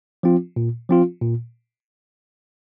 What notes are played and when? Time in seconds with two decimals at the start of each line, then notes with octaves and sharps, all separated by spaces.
0.23 F3 C4 F4
0.56 A#2
0.89 F3 C4 F4
1.22 A#2